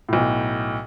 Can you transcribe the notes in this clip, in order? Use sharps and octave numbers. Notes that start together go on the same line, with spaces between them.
B1 A2